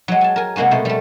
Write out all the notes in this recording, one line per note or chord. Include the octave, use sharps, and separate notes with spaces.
F#3 G#3
G#5 A5
A#4 G#5
C3 G#3 A#3 F#4 G#5
B2 A3 C5
G3 A3